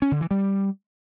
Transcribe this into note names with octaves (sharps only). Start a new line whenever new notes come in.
C#4
D3
E3
G3